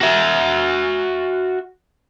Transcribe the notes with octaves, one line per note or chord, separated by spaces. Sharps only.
F#4 E5